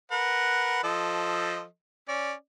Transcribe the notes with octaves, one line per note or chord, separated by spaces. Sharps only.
A#4 B4 F#5
F3 A4 D#5
C#4 D5